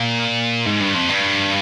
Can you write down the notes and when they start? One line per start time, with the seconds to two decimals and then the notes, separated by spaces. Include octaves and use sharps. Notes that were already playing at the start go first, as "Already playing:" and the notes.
Already playing: A#2
0.66 G#2
0.80 G2
0.94 F2
1.09 G2